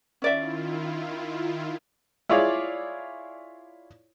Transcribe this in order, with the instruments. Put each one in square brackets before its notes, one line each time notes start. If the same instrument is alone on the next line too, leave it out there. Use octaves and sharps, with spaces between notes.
[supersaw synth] D#3 E4 F4 [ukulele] C#4 D5 E5
[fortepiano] E4 F4 G#4 C#5 D5 F5